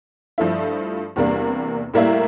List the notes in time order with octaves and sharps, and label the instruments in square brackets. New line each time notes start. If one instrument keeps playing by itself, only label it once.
[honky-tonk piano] G2 F3 A3 E4
E2 C3 G3 A#3 D4
A2 G3 A#3 E4